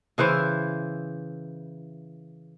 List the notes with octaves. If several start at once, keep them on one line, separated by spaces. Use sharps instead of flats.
C#3 E3 E4 C5